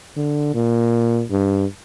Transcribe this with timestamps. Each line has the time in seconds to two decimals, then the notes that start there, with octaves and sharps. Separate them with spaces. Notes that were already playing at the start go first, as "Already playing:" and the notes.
0.16 D3
0.54 A#2
1.31 G2